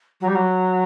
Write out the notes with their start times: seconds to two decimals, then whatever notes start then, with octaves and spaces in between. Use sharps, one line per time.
0.21 F#3
0.28 G3
0.35 F#3